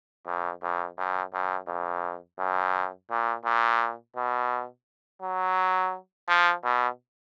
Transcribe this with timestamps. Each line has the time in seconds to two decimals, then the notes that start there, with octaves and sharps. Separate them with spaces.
0.26 F2
0.62 F2
0.98 F#2
1.33 F#2
1.68 F2
2.39 F#2
3.10 A#2
3.45 A#2
4.16 B2
5.22 F#3
6.28 F3
6.63 B2